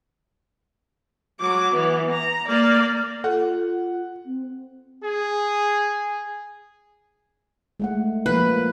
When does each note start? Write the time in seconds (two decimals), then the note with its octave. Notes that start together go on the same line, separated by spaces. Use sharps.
1.40 F#3 D6
1.74 E3 B3
2.11 A#5
2.48 A#3 D5
3.24 F4 A4 F#5
4.26 C4
5.03 G#4
7.80 G#3 A3 F#5
8.26 F3 A#3 A#4 B4